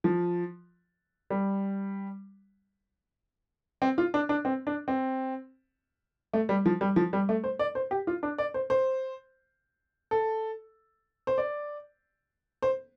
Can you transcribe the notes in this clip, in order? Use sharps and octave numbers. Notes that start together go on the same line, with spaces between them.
F3
G3
C4
F4
D4
D4
C4
D4
C4
A3
G3
F3
G3
F3
G3
A3
C5
D5
C5
G4
F4
D4
D5
C5
C5
A4
C5
D5
C5